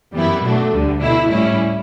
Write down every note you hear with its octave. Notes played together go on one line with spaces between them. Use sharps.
F#2 E3 G3 B3 E4
B2 F#3 A3 D4
D2 D3 G3
B2 A3 E4
A2 G3 C#4 E4